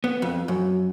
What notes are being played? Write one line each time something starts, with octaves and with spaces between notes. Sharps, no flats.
B3
F2
F#2